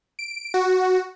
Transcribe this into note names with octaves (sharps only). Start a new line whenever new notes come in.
D7
F#4